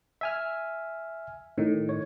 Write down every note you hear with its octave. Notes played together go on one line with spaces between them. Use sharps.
E5 G#5 F6
A2 D#3
C#5